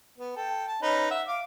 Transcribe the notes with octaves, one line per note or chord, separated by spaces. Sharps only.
B3
A4 G5
A5
C#4 D#4 B4
E5 F#5
F5 D6